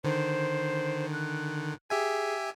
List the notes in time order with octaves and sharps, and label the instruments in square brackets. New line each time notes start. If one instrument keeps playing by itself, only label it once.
[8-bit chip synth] D3 D#3 [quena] C5
[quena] F#6
[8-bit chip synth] G4 E5 G#5 [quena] G#4